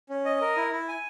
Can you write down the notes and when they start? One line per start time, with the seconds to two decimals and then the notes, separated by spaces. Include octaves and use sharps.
0.09 C#4
0.25 D#5
0.41 A#4
0.57 E4
0.72 E4
0.89 G#5